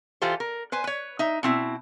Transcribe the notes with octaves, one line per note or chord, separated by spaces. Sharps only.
E3 F4 G4 A4 C5
A#4
B4 C5 G#5
B4 C#5
D#4 E5
B2 C4 E4